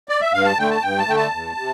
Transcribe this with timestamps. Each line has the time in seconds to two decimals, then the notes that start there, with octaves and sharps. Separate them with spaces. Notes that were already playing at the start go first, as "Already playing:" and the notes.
0.09 D5
0.21 E5
0.33 G2 F5
0.45 A5
0.58 D3 A3 G5
0.70 A5
0.82 G2 G5
0.98 A5
1.07 D3 A3 G5
1.16 A5
1.33 E2
1.57 C3